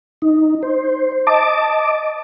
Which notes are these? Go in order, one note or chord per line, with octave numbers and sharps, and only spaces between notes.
D#4
C5
D#5 A5 D6